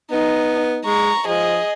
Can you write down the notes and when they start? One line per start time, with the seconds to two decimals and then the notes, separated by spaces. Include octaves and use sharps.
0.11 B3 D#4
0.85 G#3 A#5 C#6
1.27 F3 G#4 D#5